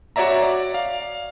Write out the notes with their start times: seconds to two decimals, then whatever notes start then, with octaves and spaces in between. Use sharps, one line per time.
0.16 F#4 C#5 D5 E5 A#5
0.42 D5
0.74 F5